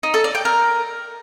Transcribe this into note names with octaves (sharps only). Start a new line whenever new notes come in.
D#4
A4
D5
G5
A#4